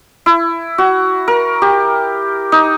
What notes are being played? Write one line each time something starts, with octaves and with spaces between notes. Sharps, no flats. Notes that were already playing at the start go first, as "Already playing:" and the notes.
E4
F#4
A#4
G4
D#4